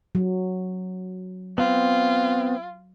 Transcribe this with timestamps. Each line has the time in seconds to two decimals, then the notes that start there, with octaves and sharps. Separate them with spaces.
0.15 F#3
1.58 B3 C4 F4